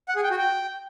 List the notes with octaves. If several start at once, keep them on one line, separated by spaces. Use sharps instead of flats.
F#5
G#4
G5
F#4
G5